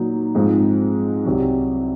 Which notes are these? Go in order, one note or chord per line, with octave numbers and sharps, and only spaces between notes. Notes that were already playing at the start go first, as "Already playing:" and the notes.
Already playing: A#2 F#3 A#3 D#4 F#4
G#2 F3 G#3 C4
C2 C3 F#3